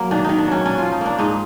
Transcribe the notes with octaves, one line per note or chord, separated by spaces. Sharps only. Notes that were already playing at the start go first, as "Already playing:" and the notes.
Already playing: F#3 A#3
D#3 D4
D#3 D#4
D4
F#3 C#4
C#4 D4
F3 F4
D#4
A#3 D4
G#2 D#4